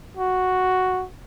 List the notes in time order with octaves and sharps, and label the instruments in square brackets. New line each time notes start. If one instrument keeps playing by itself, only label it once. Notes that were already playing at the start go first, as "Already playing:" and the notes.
[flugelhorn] F#4